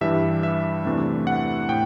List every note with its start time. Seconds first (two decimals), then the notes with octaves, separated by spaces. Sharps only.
0.01 G2 E3 G3 D4 E5
0.43 E5
0.85 E2 C3 E3 A3 D4
1.27 F#5
1.69 A2 G5